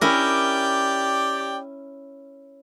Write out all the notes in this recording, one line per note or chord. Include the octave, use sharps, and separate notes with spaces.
C#4 E4 G4 A#4 D5 G5